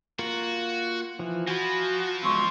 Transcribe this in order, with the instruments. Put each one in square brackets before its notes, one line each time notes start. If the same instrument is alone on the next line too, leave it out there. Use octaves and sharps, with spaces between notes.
[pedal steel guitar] A#3 F4 A#4 [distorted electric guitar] F#4
[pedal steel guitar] E3 F3
[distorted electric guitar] F3 [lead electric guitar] F#4 [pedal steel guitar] G#5 B5
[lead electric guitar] E2 G#2 [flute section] C6 C#6 E6